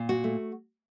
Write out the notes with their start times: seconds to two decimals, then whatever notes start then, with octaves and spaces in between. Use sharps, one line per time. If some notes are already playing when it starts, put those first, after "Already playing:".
Already playing: A#2
0.09 F#4
0.24 A3